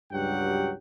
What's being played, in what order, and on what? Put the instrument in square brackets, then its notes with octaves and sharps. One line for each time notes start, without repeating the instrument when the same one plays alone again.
[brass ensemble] C#2 G2 F#3 G4 F#5 G5